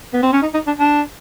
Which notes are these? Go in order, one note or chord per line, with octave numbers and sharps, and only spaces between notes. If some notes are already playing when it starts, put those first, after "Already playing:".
B3
C4
C#4
D#4
D#4
D4
D4